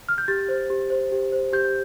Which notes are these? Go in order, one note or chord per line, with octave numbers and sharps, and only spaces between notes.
F6
G6
G4 A6
C5
G4
C5
G4
C5
G4 G6